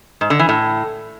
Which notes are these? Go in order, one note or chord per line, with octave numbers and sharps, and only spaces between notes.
G#2
D3
E3
A2